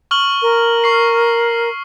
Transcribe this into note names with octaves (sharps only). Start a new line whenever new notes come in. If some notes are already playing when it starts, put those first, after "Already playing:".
C#6 F6 F#7
A#4
C#6 C7